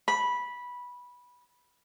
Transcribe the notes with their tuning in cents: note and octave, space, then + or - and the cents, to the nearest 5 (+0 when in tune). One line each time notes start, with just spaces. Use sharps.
B5 -10